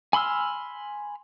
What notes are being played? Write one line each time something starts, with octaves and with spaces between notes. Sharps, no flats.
G#5 B5 C6 E6 F6